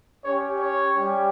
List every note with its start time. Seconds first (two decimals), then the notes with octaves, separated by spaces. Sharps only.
0.25 C#4 G4 C#5
0.59 C#5
0.95 G3 C#4 G4